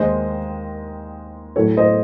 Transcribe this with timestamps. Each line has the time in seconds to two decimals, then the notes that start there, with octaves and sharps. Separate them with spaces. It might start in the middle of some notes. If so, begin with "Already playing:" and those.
Already playing: D#2 D#3 G#3 C5 D#5
1.56 A2 F#3 A3 A4 C#5
1.77 C5 D#5